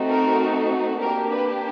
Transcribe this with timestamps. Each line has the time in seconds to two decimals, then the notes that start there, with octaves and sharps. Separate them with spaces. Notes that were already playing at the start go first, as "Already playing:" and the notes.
Already playing: A3 C4 D#4 F#4
0.09 A#4
1.01 A#3 D4 G4 A#4
1.31 B4